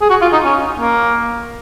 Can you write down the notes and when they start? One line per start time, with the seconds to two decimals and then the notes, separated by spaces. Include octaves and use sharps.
0.01 G#4
0.10 F#4
0.22 F4
0.33 D#4
0.45 C#4
0.78 A#3